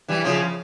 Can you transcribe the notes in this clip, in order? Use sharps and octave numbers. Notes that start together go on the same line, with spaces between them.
E3 G3
C#3 F3